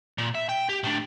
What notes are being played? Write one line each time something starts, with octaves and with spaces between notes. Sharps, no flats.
A#2
E5
G5
G4
A2 D4